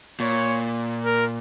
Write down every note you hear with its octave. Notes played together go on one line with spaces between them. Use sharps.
A#2 C#5
A#4